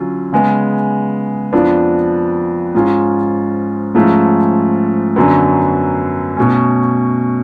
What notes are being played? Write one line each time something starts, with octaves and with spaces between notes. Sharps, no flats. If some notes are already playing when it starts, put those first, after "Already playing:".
Already playing: D3 F#3 C#4 F4
C#3 G#3 B3
F2 F3 B3 D4
G#2 G#3 C#4 F4
G#2 F3 A3 C#4 F4
F#2 D3 F#3 B3
B2 A3 C#4